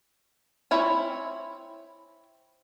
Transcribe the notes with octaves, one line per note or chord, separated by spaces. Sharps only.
C4 E4 C#5 G#5